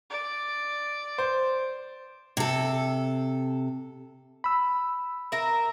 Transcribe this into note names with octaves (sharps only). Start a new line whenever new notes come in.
D5
C5
C3 A4
B5 E6
A#4 E5